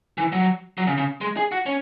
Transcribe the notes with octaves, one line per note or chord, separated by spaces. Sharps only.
E3
F#3
F#3
C#3
C#3
G#3
G#4
F#4
C#4